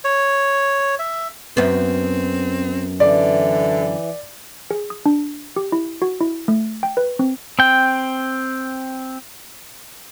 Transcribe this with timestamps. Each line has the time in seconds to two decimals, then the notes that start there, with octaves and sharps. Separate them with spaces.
0.04 C#5
0.99 E5
1.57 F#2 B3 C4
3.00 D3 E3 D5
4.71 G#4
4.90 D#6
5.06 D4
5.56 G4
5.72 E4
6.02 F#4
6.21 E4
6.48 A3
6.83 G5
6.97 B4
7.19 C4
7.59 C4 G5